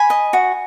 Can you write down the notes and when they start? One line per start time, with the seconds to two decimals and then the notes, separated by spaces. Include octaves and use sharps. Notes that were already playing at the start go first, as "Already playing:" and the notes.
Already playing: G#5 B5
0.10 D#5
0.33 F#4